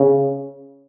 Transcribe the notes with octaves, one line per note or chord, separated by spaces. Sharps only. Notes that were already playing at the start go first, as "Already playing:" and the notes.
Already playing: C#3